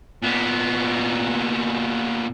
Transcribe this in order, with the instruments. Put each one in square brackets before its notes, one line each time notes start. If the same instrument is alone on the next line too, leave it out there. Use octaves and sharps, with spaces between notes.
[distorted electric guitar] A#2 B3